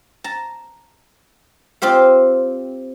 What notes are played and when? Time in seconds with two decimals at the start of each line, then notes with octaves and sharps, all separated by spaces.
0.24 A5 A#5
1.82 C4 F4 G4 C5 F5